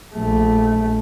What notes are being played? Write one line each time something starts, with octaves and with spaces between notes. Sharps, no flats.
A#1 A3